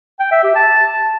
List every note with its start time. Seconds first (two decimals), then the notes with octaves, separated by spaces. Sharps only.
0.19 G5
0.31 E5
0.43 G4
0.55 A5